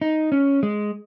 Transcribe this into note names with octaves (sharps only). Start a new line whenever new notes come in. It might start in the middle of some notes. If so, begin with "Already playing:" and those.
D#4
C#4
G#3